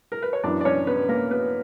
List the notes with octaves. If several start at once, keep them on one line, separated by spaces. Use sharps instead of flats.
A#4
B4
C#5
F#2 E3 B3 D4 D5
D5
C#4 C#5
B3 B4
A#3 A#4
B3 B4